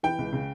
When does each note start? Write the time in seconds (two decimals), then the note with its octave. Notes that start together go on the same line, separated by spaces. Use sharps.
0.03 E3 G5
0.18 C#2
0.33 C#3